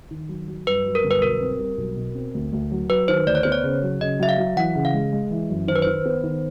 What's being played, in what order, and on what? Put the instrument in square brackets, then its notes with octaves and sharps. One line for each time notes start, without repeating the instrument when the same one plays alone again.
[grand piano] D#3
F#3
F#3
[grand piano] G2 [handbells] B4
[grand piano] F#3
[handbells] A#4
[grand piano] G1
[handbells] B4
[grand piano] B1 [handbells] A#4
[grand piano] C4
G3
B1
B2
C4
D2
D2
F#3
[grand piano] F#3 [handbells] B4
[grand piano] D#3 [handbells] C5
[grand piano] D2 [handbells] D5
[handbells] C#5
[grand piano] B3 [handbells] C5
[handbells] C#5
[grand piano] C#3
F#3
[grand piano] C#3 [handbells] D#5
[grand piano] F#3 [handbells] E5
[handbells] F5
[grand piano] F#3
[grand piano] E3 [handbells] F#5
[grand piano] C#3
[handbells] F5
[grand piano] G#3
G#3
E3
F#2
[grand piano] D#3 [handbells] C5
[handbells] B4
[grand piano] D#3 [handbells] C5
[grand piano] B3
D#3